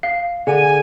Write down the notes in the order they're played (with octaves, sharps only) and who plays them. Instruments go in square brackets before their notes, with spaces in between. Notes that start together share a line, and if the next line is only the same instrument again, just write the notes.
[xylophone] F5
[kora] D3 [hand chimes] G#4 [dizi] G#5